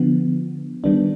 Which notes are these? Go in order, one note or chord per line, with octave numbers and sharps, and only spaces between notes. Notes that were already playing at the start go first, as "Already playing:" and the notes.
Already playing: D3 F3 B3
D#3 G3 B3 D4